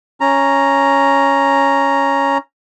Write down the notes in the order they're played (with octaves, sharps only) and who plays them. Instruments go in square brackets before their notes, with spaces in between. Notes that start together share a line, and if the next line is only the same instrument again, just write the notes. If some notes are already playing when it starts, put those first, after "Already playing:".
[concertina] C#4 A#5